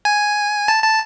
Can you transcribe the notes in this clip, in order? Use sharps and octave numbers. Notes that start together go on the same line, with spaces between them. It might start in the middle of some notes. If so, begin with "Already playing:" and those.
G#5
A5
A5